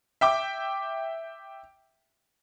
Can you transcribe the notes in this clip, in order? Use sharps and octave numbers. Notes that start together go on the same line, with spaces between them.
E5 G5 D6